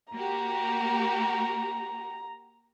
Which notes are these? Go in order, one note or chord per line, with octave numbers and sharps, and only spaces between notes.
A#3 F#4 G4 A#5